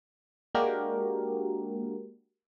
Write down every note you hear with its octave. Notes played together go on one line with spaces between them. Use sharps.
G#3 A#3 D4 F#4 G4 A#4